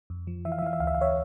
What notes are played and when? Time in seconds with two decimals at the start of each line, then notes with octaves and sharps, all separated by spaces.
0.10 F2
0.27 F3
0.45 E3 E5
0.52 F5
0.58 E5
0.62 E3 F5
0.73 E5
0.80 D2 F5
0.87 E5
0.95 F5
0.98 D2 C#5 E5